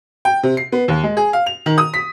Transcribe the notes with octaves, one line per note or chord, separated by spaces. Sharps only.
G5
C3
C7
B3
D#2
G#3
G#4
F5
F7
D#3
D#6
B6